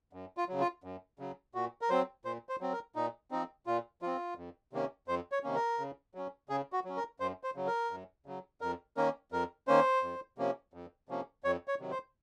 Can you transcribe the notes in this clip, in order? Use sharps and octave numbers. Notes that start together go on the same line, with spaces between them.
F#2
F4
C#3 F#3
F4
F#2
C#3 F#3
A#2 F#4
A#4
F#3 C4 C5
A#2 C5
C5
F#3 C4
A#4
A#2 D#4
F3 C4 D#4
A#2 F4
F3 C4 F4
F2
C3 D#3 A#3 C#4
F2 C5
C#5
C3 D#3 A#3 C#4
A#4
C#3
F#3 C#4
C#3 G#4
F#4
F#3 C#4
A#4
F#2 C5
C5
C#3 F#3
A#4
F#2
C#3 F#3
F2 A#4
D#3 A#3 C#4 A#4
F2 A#4
D#3 A#3 C#4 C5
F2
C3 F3 A#3 C#4
F2
C3 F3 A#3 C#4
F2 C#5
C#5
C3 D#3 F#3
C5